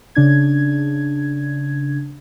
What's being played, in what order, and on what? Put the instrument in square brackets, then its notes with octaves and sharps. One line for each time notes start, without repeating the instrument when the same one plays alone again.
[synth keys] C#3 D4 G#6